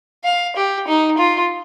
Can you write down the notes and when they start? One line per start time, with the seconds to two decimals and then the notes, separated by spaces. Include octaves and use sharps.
0.25 F5
0.56 G4
0.88 D#4
1.18 F4